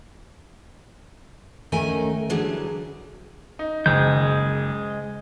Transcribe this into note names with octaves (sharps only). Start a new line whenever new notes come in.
D2 D#3 A3 C#4 A#4 G#5
D3 E3 F#3 G3 D4 G#4
D#4
F#1 G#3 G6